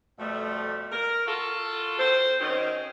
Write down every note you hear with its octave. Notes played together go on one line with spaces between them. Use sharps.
F2 B2 G3 A3
A#4
F4 F#4 A4
C4 C5
D#3 F#3 C4 C#4 D#4